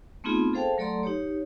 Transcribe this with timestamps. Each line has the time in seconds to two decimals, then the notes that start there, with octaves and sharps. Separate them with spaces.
0.24 A3 B3 C4 D#4 F4 G#4
0.53 G#4 A4 C5 F5 G5 A5
0.78 F#3 A3 A4 D5 A#5 C6
1.03 D#4 G4 C#5